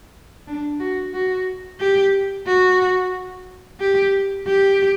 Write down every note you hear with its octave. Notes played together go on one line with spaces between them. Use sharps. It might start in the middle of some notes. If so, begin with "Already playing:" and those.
D4
F#4
F#4
G4
F#4
G4
G4